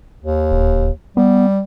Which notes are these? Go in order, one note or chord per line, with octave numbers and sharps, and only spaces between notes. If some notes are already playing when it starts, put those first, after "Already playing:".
D#2
D1
G3 B3